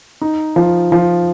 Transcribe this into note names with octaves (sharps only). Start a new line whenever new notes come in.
D#4
F3
F3